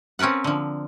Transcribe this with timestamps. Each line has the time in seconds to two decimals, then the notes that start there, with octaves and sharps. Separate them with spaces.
0.19 C4 C#4 A#4 B4 F#5
0.44 D3 F3